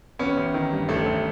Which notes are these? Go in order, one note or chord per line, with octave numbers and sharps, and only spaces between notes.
A1 B3 C#4
A1
D#3
G2
A1 A3
A1